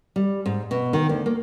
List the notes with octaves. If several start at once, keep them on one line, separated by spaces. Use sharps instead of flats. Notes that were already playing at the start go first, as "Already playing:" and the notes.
G3
G#2
B2
D#3
D2
A#3